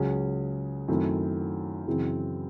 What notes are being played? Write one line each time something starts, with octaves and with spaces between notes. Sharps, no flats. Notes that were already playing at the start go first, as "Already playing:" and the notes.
Already playing: C#2 C#3 F#3 C#4 G#4
F#2 D#3 A3 C4 E4
F#2 C#3 E3 C4